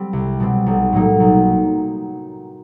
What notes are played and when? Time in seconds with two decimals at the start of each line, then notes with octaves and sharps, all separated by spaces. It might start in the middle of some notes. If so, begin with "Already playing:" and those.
Already playing: G3 C4
0.13 C2
0.40 B2 G3 C4
0.66 B1
0.93 A2 F#3 A#3 D#4
1.20 B1